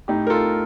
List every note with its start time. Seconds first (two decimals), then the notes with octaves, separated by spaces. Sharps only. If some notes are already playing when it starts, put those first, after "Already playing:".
0.08 A2 D#4 G4
0.27 A#4
0.30 F4 A4